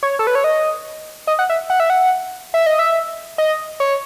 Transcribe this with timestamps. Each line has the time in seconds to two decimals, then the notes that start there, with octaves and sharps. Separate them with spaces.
0.03 C#5
0.19 A4
0.27 B4
0.35 C#5
0.44 D#5
1.27 D#5
1.39 F#5
1.50 E5
1.70 F#5
1.80 E5
1.90 F#5
2.54 E5
2.66 D#5
2.79 E5
3.38 D#5
3.80 C#5